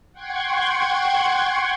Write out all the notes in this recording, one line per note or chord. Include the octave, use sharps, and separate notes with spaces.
F#5 G5 C6 C#6 G#6